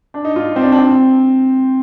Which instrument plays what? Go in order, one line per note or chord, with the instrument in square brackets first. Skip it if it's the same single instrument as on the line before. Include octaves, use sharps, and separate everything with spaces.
[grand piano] D4
D#4
F4
C4
D4
D4
C4